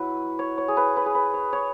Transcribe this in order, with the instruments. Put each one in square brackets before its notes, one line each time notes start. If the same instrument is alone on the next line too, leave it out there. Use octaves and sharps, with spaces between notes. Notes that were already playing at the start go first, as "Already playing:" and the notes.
Already playing: [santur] F#3 E4 B4
C#5
C#5
G#4
B4
B4
G#4
B4
C#5
C#5